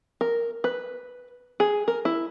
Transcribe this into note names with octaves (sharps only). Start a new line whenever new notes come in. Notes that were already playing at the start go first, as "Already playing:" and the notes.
A#4
B4
G#4
A#4
E4